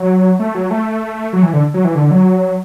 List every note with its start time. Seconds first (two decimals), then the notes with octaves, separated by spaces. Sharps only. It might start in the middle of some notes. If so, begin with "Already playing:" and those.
Already playing: F#3
0.39 A3
0.55 F#3
0.71 A3
1.33 F#3
1.43 E3
1.53 D3
1.74 F#3
1.85 E3
1.95 D3
2.11 F#3